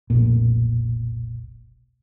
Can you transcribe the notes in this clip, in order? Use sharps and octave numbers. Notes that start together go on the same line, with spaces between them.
F1 B1 A#2